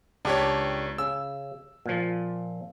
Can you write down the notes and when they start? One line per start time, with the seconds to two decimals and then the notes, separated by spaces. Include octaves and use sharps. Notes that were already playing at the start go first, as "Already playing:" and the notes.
0.25 C#2 D4 G4 C#5
0.98 C#3 E6
1.86 A#2 F3